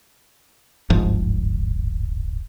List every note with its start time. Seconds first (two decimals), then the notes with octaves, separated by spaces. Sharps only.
0.90 D1 G1 G#2 F3